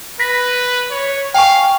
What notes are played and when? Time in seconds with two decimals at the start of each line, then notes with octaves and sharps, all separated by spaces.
0.20 B4 A#6 B6
0.90 C#5
1.34 F5 G5 G#5 C#6